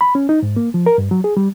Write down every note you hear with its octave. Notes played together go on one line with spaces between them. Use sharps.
B5
C#4
D#4
G#2
A#3
F3
A#4
G2
F#3
G#4
G3